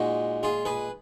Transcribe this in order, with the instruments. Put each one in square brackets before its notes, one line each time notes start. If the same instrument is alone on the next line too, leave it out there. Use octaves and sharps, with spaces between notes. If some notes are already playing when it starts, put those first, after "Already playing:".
Already playing: [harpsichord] A#2 G#3 D#4 F#4
F4 G#4
G#4 B4